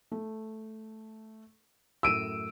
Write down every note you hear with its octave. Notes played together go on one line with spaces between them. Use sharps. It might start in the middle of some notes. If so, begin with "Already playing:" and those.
A3
F#2 A2 E6 D7 D#7